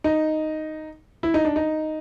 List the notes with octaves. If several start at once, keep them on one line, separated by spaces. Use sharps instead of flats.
D#4
E4
D#4
D4
D#4